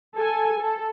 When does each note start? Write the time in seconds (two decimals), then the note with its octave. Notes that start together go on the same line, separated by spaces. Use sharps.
0.16 A4 G#5
0.60 A4